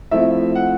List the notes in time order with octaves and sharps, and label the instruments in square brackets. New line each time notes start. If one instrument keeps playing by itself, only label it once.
[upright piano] F3 A3 C4 E4 E5
F#5